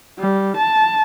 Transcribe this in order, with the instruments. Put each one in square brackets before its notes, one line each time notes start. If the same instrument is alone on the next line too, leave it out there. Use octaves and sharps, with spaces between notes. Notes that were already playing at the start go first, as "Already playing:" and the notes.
[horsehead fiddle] G3
A5